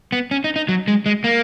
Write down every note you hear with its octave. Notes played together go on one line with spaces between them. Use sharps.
B3
C#4
D#4
D#4
F#3
G#3
G#3
A#3